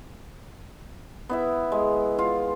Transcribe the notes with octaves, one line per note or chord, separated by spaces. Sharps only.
B3 E4 E5
G#3
F4 F5